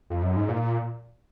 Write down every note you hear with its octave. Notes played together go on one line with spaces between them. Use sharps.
F2
F#2
G#2
A#2